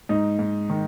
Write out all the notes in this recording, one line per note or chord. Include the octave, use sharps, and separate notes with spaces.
G#2 D#4
G#2
D#3